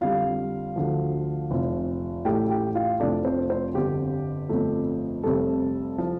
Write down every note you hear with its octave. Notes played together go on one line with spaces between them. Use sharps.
F2 D3 G3 F4 F5
D2 D3 F3
F1 F2 F3
A1 A2 A3 G4 G5
G4 G5
F4 F5
F1 F2 C3 F3 A3 D4 D5
C4 C5
C4 C5
G1 F2 D3 G4
G1 F2 F3 A3
F1 F2 C3 G3 A4
F3